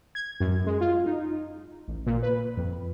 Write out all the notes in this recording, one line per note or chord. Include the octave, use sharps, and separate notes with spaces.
G#6
F#2
G#3
F4
D#4
A1
A#2
B4
F2